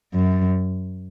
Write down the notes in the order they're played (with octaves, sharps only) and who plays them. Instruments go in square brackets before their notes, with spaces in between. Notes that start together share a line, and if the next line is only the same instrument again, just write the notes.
[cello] F#2